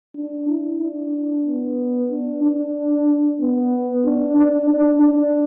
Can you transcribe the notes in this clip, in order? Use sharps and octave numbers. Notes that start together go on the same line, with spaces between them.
D4
E4
D4
B3
D4
D4
B3
D4
D4
D4
D4